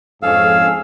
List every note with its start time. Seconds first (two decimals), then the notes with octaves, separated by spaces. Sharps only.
0.23 F2 G#2 C#4 G#4 A4 F5 E6